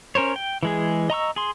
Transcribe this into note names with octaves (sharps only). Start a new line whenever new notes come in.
C#4 A#4 C5 C#5
G5
E3 G#3 G#4
D#5 A#5 C#6 E6
G#4 C6